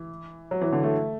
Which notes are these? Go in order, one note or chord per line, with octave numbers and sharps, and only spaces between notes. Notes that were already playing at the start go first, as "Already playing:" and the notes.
Already playing: E3
F#3
E3
D3
A3